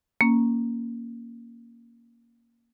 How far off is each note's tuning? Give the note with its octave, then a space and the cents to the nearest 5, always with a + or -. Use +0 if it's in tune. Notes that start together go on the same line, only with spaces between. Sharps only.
A#3 +0 C#4 +0